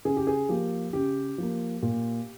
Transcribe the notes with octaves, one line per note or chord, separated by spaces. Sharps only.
C#3 G#4
G4
G#4
F3 A#3 G4
C#3 G4
F3 A#3
A#2